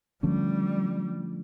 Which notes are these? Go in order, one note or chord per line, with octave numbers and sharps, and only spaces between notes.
D3 F3 G3 A3 C#4